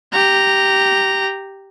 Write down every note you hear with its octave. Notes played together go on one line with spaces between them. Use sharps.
G4 A#5